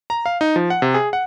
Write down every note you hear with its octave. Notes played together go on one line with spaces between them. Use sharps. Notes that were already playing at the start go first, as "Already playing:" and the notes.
A#5
F5
D#4
F3
F#5
C3
G#4
F#5